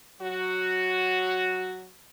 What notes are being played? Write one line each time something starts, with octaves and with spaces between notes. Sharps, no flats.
F#3 F#4